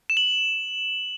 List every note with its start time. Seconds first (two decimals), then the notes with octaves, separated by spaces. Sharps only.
0.10 E7
0.17 F#7